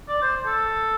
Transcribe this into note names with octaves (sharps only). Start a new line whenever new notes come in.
D5
C5
A4